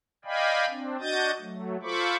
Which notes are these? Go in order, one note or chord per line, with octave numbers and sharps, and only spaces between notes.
D5 D#5 F5 G5 G#5 B5
C4 D4
D4 F#4 D#5 D#6 G6 A6
F#3 A3
F4 A4 C5 B5 C#6 D6